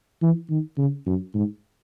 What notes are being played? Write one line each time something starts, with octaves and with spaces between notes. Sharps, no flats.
E3
D#3
C#3
F#2
G#2